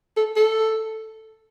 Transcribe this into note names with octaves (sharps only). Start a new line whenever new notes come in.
A4
A4